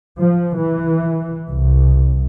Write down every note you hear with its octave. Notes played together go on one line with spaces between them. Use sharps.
F3
E3
C2